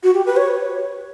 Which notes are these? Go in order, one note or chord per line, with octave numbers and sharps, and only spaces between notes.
F#4
G4
B4
C#5